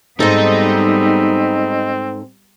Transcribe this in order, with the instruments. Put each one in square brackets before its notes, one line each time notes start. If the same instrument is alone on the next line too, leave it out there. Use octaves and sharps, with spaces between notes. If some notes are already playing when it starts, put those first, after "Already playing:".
[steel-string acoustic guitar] G#2 A4 [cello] G3 B3 [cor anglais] C4 [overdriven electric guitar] D#4